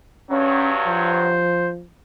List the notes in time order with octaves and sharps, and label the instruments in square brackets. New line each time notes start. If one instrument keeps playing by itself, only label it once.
[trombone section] G2 F#3 [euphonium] C#4
[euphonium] F3 [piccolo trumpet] C5